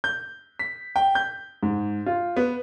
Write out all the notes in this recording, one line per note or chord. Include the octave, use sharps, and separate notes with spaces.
G6
B6
G5
G6
G#2
F4
B3